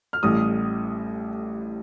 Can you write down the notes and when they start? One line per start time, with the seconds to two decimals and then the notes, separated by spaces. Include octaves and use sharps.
0.13 F6
0.23 A1 A2 G3 D#6